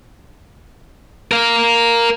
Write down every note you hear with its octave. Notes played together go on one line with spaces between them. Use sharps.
A#4 F5